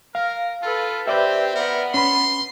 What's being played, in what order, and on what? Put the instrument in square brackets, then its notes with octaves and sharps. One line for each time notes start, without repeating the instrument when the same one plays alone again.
[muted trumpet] A#4 [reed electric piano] F5
[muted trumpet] F4 [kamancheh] A4 B4
[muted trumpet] C4 [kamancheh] G4 C5 [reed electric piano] B4 D5 E5
[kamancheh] B3 [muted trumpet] A#4
[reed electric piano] C#4 B5 [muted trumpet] C6